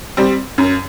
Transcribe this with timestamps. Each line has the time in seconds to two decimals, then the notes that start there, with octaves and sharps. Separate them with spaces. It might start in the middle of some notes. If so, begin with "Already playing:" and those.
0.17 G3 C4
0.58 F#2